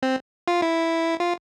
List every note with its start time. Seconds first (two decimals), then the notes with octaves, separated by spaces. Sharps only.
0.03 C4
0.48 F4
0.62 E4
1.20 F4